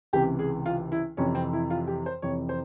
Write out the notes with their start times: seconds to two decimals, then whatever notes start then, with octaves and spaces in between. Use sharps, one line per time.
0.13 C#2 C3 E3 G4
0.39 G#4
0.66 F4
0.92 E4
1.17 F2 C3 E3 C#4
1.35 C4
1.53 E4
1.70 F4
1.87 G4
2.06 C5
2.22 F2 C3 E3 C#5
2.49 C5